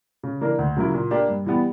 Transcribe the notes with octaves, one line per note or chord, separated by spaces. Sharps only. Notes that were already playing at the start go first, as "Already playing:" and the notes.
C#3
E3 A#3 D4 A#4
D2
C#3 F#3 A#3 E4
A#2
A#3 D4 G4
G2
E3 G3 B3